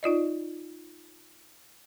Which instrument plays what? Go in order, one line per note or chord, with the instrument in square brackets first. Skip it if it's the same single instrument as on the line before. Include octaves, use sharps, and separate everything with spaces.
[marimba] D#4 F4 D5 D#5